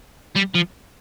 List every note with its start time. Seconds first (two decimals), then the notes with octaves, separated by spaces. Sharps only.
0.36 G3
0.54 F3